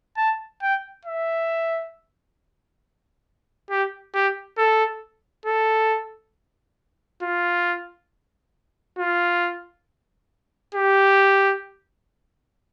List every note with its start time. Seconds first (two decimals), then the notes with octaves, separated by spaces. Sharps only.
0.17 A5
0.62 G5
1.05 E5
3.70 G4
4.15 G4
4.58 A4
5.46 A4
7.23 F4
8.98 F4
10.75 G4